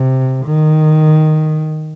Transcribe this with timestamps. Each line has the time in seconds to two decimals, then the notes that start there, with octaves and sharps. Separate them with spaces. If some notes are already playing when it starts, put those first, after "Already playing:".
Already playing: C3
0.46 D#3